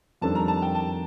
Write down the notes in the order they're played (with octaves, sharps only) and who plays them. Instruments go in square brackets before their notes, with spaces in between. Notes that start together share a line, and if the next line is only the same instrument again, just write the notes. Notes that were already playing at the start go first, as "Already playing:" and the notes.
[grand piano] F2 D#3 G3 D4 A4 [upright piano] A5
[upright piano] A#5
A5
G5
A5